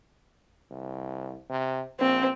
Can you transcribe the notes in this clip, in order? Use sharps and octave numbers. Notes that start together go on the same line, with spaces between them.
C2
C3
A#1 C4